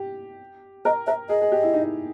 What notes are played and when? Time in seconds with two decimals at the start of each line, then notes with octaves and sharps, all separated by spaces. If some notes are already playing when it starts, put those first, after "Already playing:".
Already playing: G4
0.85 A#4 D#5
1.07 A#4 E5
1.29 G#4 D#5
1.41 G#4
1.52 G4
1.63 E4
1.74 D#4